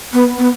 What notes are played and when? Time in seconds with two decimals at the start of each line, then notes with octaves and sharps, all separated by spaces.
0.13 B3
0.38 B3